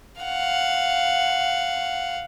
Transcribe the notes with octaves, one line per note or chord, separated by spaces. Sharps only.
F5 F#5